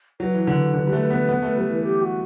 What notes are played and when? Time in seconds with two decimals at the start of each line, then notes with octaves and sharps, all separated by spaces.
0.20 F#3 B4
0.34 E3
0.47 D3
0.74 D3
0.87 G3
0.93 A3
1.10 B3
1.29 B3
1.42 A3
1.56 G3
1.70 E3
1.83 G4
2.02 F#4